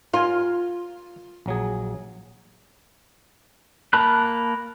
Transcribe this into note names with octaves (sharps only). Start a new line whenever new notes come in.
F4 A#4 G#5
A#1 F#3 G#4
A#3 A#4 A5 B5 F#6